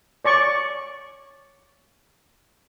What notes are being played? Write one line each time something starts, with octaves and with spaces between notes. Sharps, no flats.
C#5 D5 C#6